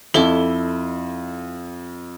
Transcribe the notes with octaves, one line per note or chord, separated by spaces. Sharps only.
F2 E4 A4 D6 G7